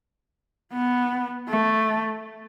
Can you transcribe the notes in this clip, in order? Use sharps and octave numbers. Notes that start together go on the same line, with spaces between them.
B3
A3